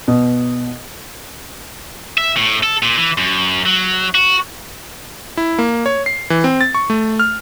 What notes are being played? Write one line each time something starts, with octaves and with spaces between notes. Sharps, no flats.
B2
E5
A2
A4
A#2
E3
F#2
F#3
F#4
E4
A#3
C#5
C7
E3
C4
A6
C#6
A3
F6